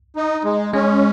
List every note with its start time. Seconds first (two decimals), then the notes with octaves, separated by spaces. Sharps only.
0.16 D#4
0.44 G#3
0.73 G#3 C#4